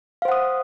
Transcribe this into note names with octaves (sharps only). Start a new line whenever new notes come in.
C5 F5 F#5 D#6